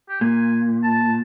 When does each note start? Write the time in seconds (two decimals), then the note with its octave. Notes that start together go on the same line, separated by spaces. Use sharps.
0.09 G4
0.21 A#2 G#5
0.83 A5